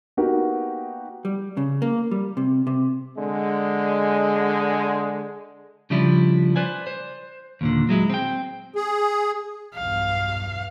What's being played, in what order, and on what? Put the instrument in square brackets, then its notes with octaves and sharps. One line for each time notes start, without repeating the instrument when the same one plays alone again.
[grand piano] A#3 B3 D#4 F#4 G4 A#4
[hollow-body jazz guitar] G3
C#3
A#3
G3
C3
C3
[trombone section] D3 G#3
[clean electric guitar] C#3 F3 G3 D4 E4
B4 C5 D5 G#5
C5
D#2 A#2 D3
F#3 G#3 E4
C4 G5
[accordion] G#4
[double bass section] B1 E2 G2 [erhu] F5